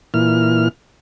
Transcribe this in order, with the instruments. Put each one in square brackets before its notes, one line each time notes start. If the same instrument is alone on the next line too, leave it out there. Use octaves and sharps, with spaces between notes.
[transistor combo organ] A#2 E3 F6